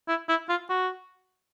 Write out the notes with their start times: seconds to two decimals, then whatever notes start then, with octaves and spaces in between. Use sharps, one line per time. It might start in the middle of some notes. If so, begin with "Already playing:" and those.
0.08 E4
0.29 E4
0.49 F4
0.69 F#4